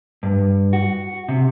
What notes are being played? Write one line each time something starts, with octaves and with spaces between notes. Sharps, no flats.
G2
F#4
C3